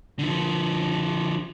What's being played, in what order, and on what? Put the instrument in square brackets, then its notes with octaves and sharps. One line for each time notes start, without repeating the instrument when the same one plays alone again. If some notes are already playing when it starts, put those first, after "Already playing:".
[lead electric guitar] D3 F3